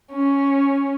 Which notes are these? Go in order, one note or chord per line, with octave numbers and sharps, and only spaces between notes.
C#4